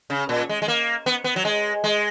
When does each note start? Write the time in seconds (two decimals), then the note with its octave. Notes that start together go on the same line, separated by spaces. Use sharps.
0.10 C#3
0.29 A#2
0.49 G#3
0.62 G#3
0.68 A#3
1.06 B3
1.24 B3
1.36 F#3
1.45 G#3
1.84 G#3